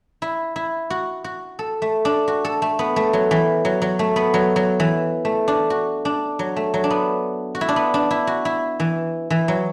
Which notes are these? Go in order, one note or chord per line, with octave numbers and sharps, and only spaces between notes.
E4
E4
F#4
F#4
A4
A3
D4
F#4
A4
A3
B3
A3
F#3
E3
F#3
F#3
A3
B3
F#3
F#3
E3
A3
D4
F#4
D4
F#3
A3
F#3
D4
B3
F#4
E4
D4
B3
D4
E4
F#4
E4
E3
E3
F#3